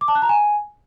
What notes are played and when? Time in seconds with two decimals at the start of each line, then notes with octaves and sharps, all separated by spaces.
0.01 D6
0.08 A5
0.15 F#6
0.22 A#5
0.29 G#5